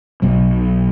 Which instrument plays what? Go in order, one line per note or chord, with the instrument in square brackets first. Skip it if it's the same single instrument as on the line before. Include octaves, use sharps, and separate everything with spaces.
[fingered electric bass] B1 B2 F#3